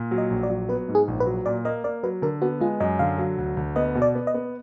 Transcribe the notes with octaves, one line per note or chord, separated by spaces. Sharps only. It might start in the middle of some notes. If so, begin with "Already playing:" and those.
Already playing: A#2
F#3
D#5
A#1
D5
F#3
B3 B4
G#2
G#4
A#1
B4
F#3
A#2 D5
A#3 D#5
A#3 D5
F#3 B4
D3 A#4
B3 F#4
G#3 F4
F#2 D#5
D3 F5
F#3
D2
D2
B3 D#5
B2
D5
B3
D#5
B3